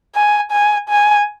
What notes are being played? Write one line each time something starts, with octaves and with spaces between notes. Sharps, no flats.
G#5
G#5
G#5